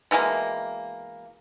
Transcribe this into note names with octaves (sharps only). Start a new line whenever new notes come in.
B2 E3 G#3 A#3